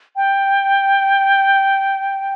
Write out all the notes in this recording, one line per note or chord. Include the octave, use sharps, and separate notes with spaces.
G5